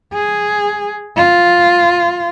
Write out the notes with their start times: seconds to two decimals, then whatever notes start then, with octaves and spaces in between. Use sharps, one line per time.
0.13 G#4
1.17 F4